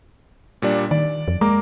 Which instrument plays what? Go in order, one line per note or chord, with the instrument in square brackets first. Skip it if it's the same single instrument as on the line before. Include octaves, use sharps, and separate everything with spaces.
[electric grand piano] A#2 G3 D4
[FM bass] D#3 [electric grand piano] D5
[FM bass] F2
[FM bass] G#3 [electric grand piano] A#3 A#5 D6